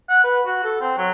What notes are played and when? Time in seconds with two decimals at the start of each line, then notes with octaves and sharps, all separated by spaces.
0.09 F#5
0.24 B4
0.46 F#4
0.64 A4
0.81 C4
0.98 F#3